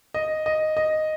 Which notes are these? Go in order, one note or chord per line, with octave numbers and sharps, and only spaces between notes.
D#5
D#5
D#5